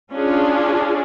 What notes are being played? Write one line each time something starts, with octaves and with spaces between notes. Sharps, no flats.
C#4 D4 F4 G#4